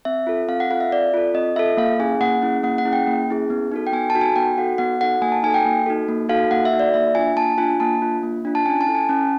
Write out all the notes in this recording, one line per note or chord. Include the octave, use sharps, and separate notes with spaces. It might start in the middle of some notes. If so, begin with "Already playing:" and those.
C4 E5
F4 A4
C4 F5
F#5
F4 A4 F5
E5
C4 D5
F4 A4
C4 D#5
F4 A4 E5
A#3 F5
C#4 E4 G#4 G#5
A#3 F#5
C#4 E4 G#4
A#3 F#5
F#5
C#4 E4 G#4
G5
A#3
C#4 E4 G#4
B3
D#4 F#4 A4
G5
B3 G#5
A5
D#4 F#4 A4
G#5
B3 G5
D#4 F#4 A4 F#5
B3 F#5
D#4 F#4 A4 F#5
A#3 G#5
A5
D#4 F#4 A4 G#5
G5
A#3
D#4 F#4 A4
A#3
D#4 F#4 A4 F5
A#3 F#5
E5
D#4 F#4 A4
D5
A#3 E5
D4 F4 G#5
A#3 A5
D4 F4 G#5
A#3 A5
D4 F4
A#3
D4 F4
A5
C#4 G#5
A5
E4 A4
G#5
C#4 A5